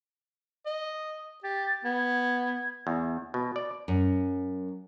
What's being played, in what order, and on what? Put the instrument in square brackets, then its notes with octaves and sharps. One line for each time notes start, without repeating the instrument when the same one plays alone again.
[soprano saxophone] D#5
[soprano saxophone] G4 [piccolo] A6
[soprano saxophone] B3 [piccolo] G#6
[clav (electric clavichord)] E2
B2
D5
[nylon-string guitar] F#2